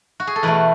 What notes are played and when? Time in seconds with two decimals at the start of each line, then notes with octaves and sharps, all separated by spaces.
0.20 F#4
0.27 G#4
0.36 A4
0.43 E2 B2 A3 B4